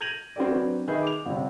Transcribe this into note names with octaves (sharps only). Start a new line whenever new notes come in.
G6 G#6 A#6 D#7 F7 F#7
C4 F#4 G4 A4 D5
F#3 C4 D4 B4
D#3 G#4 B4 D#5 E5 G6
D6 F7
G1 C3